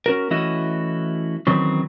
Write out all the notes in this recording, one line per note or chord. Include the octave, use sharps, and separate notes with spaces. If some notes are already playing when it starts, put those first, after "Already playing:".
C#4 F#4 A#4
E3 A3 C#4 E4 F#4 D#5
D#3 E3 F#3 C4 C#4